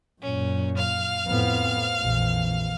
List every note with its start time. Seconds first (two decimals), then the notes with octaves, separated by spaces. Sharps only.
0.22 F#2 A#2 C#4
0.77 F5 F6
1.27 F2 A2 B3 C4
2.00 A#1 F2 E3